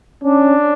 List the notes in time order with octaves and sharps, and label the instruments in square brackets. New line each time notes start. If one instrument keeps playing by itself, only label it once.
[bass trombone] C#4 [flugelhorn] D4